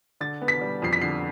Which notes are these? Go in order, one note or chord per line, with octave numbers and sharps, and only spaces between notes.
D3 A6
B3
B6
G3
F2 C7
B6
D3 C7